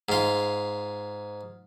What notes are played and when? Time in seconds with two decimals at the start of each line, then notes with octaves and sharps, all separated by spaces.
0.09 G#2 F4